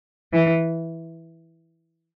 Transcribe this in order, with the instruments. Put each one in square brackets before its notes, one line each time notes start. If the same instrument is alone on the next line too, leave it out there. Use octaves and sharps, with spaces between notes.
[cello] E3